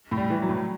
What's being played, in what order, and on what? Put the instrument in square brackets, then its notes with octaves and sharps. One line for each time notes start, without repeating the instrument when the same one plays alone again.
[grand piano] A2
[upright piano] G3
[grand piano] E3
[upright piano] F#3
[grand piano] A2